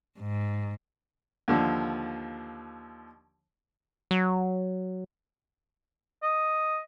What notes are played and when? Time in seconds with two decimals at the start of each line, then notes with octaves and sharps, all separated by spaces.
0.19 G#2
1.48 D#2 D3 F3
4.11 F#3
6.23 D#5